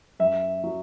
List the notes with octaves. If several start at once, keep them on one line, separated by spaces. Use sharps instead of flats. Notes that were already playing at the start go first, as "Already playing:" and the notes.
F#2 E5
F#3